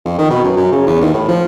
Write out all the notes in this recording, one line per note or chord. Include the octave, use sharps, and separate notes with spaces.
F2
D#3
B2
F#2
F#2
C#3
E2
D#2
A2
F3